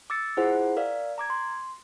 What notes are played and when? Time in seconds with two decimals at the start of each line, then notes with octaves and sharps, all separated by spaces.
0.10 D6 E6 A6 C#7
0.37 E4 F4 G#4 C5 F#5
0.77 A#4 D5 F5
1.18 A#5 D6 G#6
1.30 C6